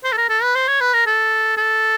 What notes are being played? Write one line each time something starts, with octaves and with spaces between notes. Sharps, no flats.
C5
A4
A#4
A4
B4
C5
C#5
B4
A#4
A4
A4